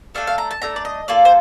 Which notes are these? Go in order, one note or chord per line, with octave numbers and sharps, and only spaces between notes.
A3 D4 A4 F5
F5
A#5
A5
A3 D4 A4 A#5
D5
D#5
A#3 F4 A4 D5
C5